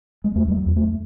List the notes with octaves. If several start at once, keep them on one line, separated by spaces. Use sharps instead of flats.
G#3
E2 A3
G3
F#3
E2
A3